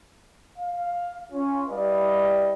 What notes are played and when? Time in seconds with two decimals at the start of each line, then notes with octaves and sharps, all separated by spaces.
0.59 F5
1.33 C#4 F4
1.69 G3 E4 B4 D5 D#5 F5